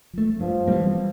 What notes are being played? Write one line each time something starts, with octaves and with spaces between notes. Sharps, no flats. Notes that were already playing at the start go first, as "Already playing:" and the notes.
F3 A3
G2 F3
E3 G3 A#3